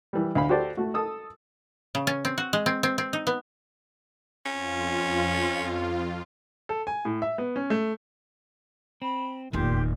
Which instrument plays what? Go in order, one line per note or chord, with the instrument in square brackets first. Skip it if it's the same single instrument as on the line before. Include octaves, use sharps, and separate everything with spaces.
[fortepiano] E3 G3
D2 F5 B5
F#4 G4 A4 C5 D5
A3 F#4
A4 D#6 E6
[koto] C#3
C#4
C4
F#4
G#3
C4
C4
C4
D#4
B3
[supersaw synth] F2 F4 [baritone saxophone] C#4
[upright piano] A4
G#5
A2
E5
B3
C#4
A3
[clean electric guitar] C4 [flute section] B5
[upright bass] F1 E2 [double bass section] A#2 [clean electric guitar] D#3 [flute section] G4 C6